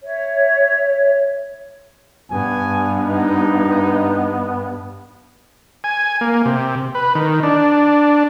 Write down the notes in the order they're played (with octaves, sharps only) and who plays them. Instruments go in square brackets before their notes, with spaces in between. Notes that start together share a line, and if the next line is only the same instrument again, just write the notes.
[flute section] C#5 E5
[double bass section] G2 [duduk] B3 [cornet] G#5
[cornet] D#4
[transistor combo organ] G#5
A#3
C3
B4
D#3
D4